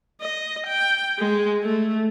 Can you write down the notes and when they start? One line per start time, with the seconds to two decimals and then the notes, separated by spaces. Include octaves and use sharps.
0.21 D#5
0.67 G5
1.19 G#3
1.63 A3